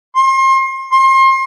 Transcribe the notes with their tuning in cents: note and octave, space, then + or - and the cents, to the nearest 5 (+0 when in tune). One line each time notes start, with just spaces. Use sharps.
C6 +35
C6 +35